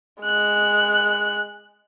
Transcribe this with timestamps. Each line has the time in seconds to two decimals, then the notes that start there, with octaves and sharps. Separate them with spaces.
0.22 G#3 F#6